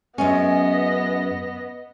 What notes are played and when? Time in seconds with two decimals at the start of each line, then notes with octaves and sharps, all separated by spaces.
0.18 F#2 G#3 B3 C#4 D#5